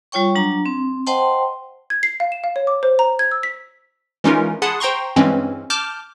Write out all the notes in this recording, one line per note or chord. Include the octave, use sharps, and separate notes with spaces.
G3 F4 C#5 G5 C#6
F#3 D4 A#5
C4
C5 D#5 F#5 G5 A5 C6
G#6
C7
F5
E7
F5
C#5
D6
C5
A#5
G#6
E6
B6
E3 G#3 C#4 D#4 F4 A#4
G#4 F#5 A5 B5 C6 D#6
C5 G5 A#5 C6 C#6
G2 E3 G#3 C4 C#4
A5 D6 F6 G6